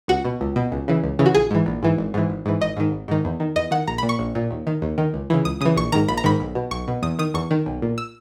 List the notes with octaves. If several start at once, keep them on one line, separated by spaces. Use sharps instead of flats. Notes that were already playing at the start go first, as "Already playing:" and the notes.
C#2 F#4
B2
C#2
B2
C#2
C#3 E3
C#2
C#3 E3
F#4
A#1 G#4
G#2 E3
A#1
G#2 E3
G#1
G#2 E3
G#1
G#2 E3
G#1 D#5
G#2 D#3
G#1
G#2 D#3
E2
D#3
E2 D#5
D#3 F#5
A#1 A#5
A#2 B5
C#6
A#1
A#2
D#2
D#3
D#2
D#3
C#2
C#3 E3
C#2 D#6
C#3 E3 D#6
A#1 C#6
G#2 D#3 A#5
A#1 B5
A#5
G#2 D#3 B5
B1
B2
B1 C#6
B2
E2 D#6
D#3 D#6
E2 C#6
D#3
B1
A#2
E6